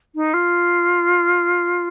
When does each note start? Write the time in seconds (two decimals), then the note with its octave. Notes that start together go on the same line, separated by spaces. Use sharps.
0.15 D#4
0.33 F4